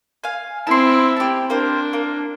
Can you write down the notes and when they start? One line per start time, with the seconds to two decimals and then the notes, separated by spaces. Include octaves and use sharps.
0.24 F5 G#5
0.67 C4 E4 A5 C6
1.17 G4 A5
1.50 A#3 D4 C5
1.93 A#3